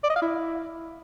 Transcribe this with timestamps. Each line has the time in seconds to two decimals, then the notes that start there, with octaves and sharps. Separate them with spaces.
0.04 D5
0.10 D#5
0.16 F5
0.22 E4